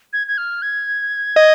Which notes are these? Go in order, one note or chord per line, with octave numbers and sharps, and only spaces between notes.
G#6
G#6
F6
G#6
D#5